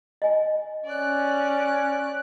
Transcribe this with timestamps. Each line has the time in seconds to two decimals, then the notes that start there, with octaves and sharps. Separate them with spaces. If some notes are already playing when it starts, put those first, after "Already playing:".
0.22 D#5 G#5
0.85 C#4 D5 F#6